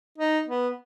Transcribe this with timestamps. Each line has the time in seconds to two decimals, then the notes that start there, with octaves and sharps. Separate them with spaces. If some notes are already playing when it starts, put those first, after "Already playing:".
0.18 D#4
0.48 B3